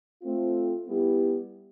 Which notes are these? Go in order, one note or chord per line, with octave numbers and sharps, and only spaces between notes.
A3 C4 F4
G3 B3 E4 G4